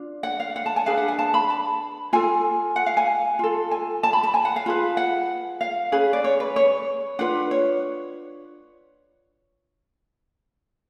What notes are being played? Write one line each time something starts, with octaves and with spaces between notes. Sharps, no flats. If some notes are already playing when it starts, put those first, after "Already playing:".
Already playing: D4 F4
F#5
F5
F#5
A5
G#5
D4 G#4 B4 F5
F#5
G#5
A5
B5
A5
F4 A4 G#5
F#5
F5
G#5
F4 A4
G#5
A5
B5
A5
G#5
F#5
F5
F4 G#4 B4
F#5
F5
C#4 G#4 B4
D5
C#5
B4
C#5
D4 F4 B4 F#5
C#5